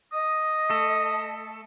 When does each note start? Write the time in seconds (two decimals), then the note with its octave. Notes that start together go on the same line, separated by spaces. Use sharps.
0.13 D#5 D#6
0.70 A3 A4